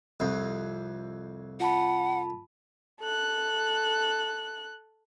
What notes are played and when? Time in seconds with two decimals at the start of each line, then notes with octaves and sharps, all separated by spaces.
0.20 C2 F2
1.60 F4 F#5 A5 B5
3.01 A4 F#6